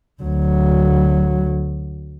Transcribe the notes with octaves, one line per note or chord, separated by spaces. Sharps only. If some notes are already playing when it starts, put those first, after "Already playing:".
D2 F#3